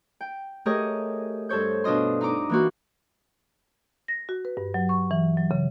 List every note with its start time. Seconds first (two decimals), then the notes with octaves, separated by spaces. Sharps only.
0.21 G5
0.66 A3 G4 G#4 A#4 C#5 D#5
1.49 G2 A4 C5 C#5 G6
1.84 B2 D4 F4 D#5 C6
2.21 D#4 D#5 A#5 D6
2.50 E3 A#3 F#4
4.08 A#6
4.29 F#4
4.45 B4
4.57 G2
4.74 F#3
4.89 C#6
5.11 E3
5.37 F#3
5.51 C#3